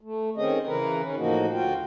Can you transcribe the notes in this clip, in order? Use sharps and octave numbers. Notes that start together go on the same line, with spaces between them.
A3
D#3 C4 C#4 G#4 D#5
C#3 E3 A#4 B4
D#3 C#4
A2 F3 A#3 D#4 F#4
D2 F4 F#4 G5